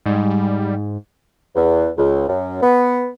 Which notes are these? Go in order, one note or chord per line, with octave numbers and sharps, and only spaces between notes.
G#2 G3
E2
C#2
F#2
B3